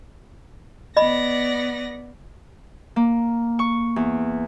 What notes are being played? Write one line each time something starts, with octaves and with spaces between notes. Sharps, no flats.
B3 D5 D#5 B5 A#6
A#3
C#6
E2